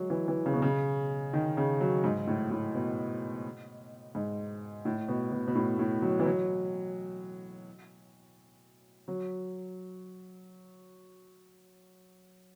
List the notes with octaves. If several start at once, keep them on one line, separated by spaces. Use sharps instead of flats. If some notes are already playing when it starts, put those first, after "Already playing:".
Already playing: F#3 G#3
E3
E3
C#3
B2
C#3
D#3
C#3
F#3
G#2
A2
A2
B2
G#2
A2
B2
B2
B2
A2
A2
F#3
E3
F#3
F#3